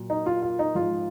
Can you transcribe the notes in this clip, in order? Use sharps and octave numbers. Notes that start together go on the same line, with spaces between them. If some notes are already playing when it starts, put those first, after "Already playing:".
Already playing: A#2 F#3
D#4
F4
F4
D#4
G#2 F3 G#3 F4